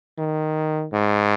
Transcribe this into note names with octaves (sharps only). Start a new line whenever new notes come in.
D#3
G#2